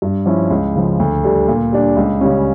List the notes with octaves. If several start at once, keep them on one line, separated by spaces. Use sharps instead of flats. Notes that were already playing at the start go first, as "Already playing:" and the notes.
G2
F3 C#4 E4
C#2
C#3 F3
D2
D3 G3 D4
A#2
G3 D4
C#2
C#3 G3 C#4